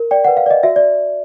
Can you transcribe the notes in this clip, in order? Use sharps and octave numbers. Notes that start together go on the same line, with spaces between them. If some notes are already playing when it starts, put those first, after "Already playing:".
Already playing: A#4
D5 G5
B4 F#5
F5
D5 D#5
F#4 E5
D5